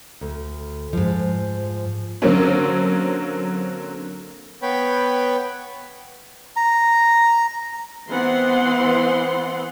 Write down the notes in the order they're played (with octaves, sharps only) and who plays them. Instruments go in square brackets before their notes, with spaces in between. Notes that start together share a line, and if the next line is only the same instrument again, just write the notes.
[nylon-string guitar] D2
G#2 F3
[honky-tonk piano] D3 F#3 A#3 C4 C#4
[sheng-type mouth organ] B3 B4 C#5 G5 B5
[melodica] A#5
[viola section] E3 B3 C4 F#5 C6